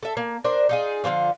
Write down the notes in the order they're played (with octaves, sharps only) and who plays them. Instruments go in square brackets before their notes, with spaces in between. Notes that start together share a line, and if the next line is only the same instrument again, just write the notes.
[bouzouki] A4 E5
A#3
D4 A#4 C5
D#4 F4 G#4
D3 F3 A#3 F4